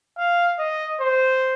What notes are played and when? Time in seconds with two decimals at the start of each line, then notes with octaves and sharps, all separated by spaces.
0.17 F5
0.59 D#5
1.01 C5